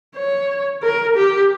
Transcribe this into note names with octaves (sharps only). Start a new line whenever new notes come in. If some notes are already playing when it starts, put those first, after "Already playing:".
C#5
A#4
G4